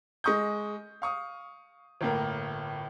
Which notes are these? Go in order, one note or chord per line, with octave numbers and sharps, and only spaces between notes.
G#3 D#5 C#6 D#6 G6
F5 C#6 D#6
G1 A2 A#3 A#4